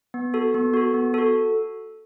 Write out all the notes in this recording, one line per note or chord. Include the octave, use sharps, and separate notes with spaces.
B3
F#4 A4
B3
F#4 A4
B3
F#4 A4